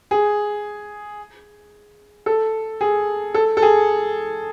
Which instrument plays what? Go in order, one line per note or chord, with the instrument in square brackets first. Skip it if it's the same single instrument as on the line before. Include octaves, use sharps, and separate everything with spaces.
[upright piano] G#4
A4
G#4
A4
A4
G#4